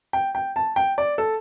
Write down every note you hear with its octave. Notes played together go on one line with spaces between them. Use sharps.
G5
G5
A5
G5
D5
A4